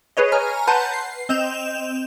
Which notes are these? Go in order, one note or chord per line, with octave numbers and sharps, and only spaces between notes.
G#4 B4 C#5 D#5
C#5 G#5 A#5 F6
B4 F#5 A5 A#5 C6 G6
C7
C4 D#5 G6 E7 F7